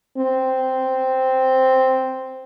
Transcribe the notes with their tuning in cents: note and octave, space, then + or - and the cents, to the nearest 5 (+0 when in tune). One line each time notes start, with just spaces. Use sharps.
C4 -5